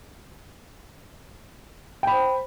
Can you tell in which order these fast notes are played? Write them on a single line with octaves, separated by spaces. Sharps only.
G5 B5 C5